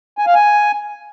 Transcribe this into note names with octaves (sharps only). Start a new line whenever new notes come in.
G#5
F5
G#5